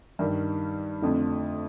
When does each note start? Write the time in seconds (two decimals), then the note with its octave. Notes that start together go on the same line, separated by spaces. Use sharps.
0.19 G2 D#3 G3
1.02 F2 D3 A3